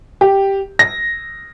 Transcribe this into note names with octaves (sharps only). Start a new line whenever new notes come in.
G4
A#6